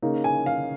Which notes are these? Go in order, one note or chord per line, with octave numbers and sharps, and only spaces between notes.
C#3 A#3 D#4
G#5
F5